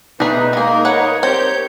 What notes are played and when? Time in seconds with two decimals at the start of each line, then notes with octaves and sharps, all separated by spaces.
0.20 B2 A3 D4 D#4 G#4 B4
0.53 G#3 A#3 G#4 A#4
0.85 G#4 B4 C#5 F#5
1.23 C4 G4 A#4 C#5 G6